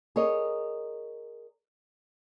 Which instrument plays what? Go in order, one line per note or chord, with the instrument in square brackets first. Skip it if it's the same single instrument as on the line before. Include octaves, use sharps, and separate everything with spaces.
[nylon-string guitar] G#4 A#4 C#5 D#5